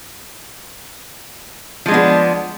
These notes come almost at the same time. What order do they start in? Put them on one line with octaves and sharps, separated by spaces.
F3 G#3 D4 B3